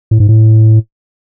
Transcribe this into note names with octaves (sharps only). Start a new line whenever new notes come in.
A2
G#2
A2